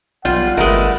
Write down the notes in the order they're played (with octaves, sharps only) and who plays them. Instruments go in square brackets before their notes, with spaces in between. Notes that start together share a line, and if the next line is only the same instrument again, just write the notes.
[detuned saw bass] B1 [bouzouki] G3 [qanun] F4 [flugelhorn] F#5
[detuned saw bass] G1 [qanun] G#3 A#4 [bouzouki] A3 E4 B4